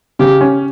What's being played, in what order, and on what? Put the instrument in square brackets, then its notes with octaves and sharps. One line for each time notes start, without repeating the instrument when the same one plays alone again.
[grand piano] C#3 [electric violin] G4
[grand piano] C#4